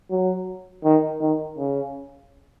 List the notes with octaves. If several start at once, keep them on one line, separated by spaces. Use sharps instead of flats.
F#3
D#3
D#3
C#3